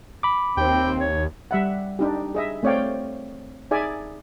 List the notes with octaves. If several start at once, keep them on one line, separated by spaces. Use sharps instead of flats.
B5 D6
D#2 C4 G5
C#5
G3 E5 F#5
D4 D#4 G4
G#4 D#5 E5
A3 C4 C#5 D5 F5 G5
D#4 G#4 D5 E5 G#5